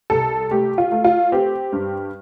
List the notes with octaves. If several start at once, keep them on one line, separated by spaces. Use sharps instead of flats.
C2 A4
A3 G4
F4
A3
F4
C4 G4
G2